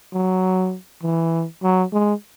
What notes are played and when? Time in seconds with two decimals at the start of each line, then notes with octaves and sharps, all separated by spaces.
0.13 F#3
1.03 E3
1.63 F#3
1.93 G#3